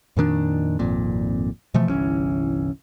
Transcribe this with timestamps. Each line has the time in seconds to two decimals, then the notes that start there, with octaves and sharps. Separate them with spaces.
0.17 F2 A#2 D#3 D4
0.79 G#1 F2 A#2
1.74 B2 E3 F3 A3
1.89 G1 C2 E3 C#4